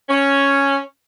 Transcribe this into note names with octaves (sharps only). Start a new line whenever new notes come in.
C#4